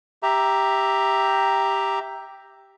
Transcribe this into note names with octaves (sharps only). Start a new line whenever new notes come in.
G4 E5 A#5